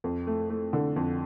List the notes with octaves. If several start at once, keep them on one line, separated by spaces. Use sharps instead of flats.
F2
A3
A3
D3
F2